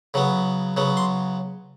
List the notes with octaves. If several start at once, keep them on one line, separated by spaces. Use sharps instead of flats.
C#3 F#3 B3
C#3 F#3 B3
C6